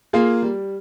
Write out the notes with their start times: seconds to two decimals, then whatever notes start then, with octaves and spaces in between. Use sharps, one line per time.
0.13 A#3 F4 G#4
0.42 G3